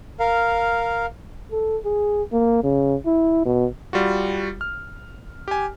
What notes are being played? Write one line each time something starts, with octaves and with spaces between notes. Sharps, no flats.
A#4 F5
A4
G#4
A#3
C#3
E4
B2
G3 F4 F#4
F6
G4 G#5